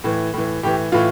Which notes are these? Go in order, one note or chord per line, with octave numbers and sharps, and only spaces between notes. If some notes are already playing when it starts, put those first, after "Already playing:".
A2 E3
A2 E3
A2 E3 G4
A2 E3 F4